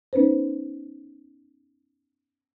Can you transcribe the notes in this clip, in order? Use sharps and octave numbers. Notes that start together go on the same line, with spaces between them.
B3 C#4 D#4 B4 C5